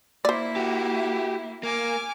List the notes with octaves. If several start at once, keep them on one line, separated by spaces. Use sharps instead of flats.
A#3 E4 C5 D5 E5
F#4 G4
A#3 G#5 D6 F6